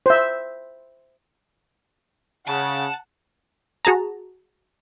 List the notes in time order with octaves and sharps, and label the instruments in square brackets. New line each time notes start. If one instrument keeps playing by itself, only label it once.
[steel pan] C5 E5
[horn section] C#3 [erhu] F#5 [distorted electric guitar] A5
[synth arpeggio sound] F#4 G#4 A5 A#5